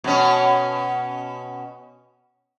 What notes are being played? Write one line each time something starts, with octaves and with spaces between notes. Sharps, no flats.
B2 C#4